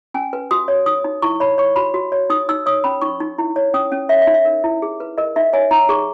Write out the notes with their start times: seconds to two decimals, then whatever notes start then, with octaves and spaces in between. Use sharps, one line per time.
0.14 C#4 G#5
0.33 B4
0.51 F#4 D#6
0.68 C#5
0.86 D#4 D#6
1.04 D#4
1.22 E4 C#6
1.40 C#5 B5
1.58 C#5 C#6
1.76 F#4 B5
1.94 F#4
2.12 C#5
2.30 D#4 D#6
2.49 D#4 E6
2.66 C#5 D#6
2.84 C#4 B5
3.02 D#4 C#6
3.20 D#4
3.38 E4
3.56 C#5
3.74 C#4 D#6
3.92 C#4
4.09 C#5 E5
4.22 E5
4.27 D#4
4.34 E5
4.45 A#4
4.64 E4
4.82 G#4
5.00 B4
5.18 A#4 D#5
5.36 D#4 E5
5.53 C#5 G#5
5.71 D#4 A#5
5.89 G#4 C#6